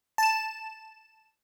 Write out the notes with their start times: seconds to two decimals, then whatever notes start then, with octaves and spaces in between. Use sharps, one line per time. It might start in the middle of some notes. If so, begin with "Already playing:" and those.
0.18 A5 E7